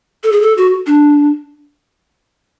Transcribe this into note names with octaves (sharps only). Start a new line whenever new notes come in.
A4
G#4
A4
F#4
D4